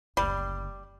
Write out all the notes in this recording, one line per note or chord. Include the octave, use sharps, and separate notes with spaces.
F#1 D2 G3